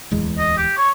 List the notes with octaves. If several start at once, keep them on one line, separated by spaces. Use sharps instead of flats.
D1 E2 G#3
D#5
G4
C#5 C#6